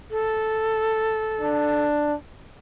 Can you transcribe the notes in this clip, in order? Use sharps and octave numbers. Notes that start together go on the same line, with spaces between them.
A4
D4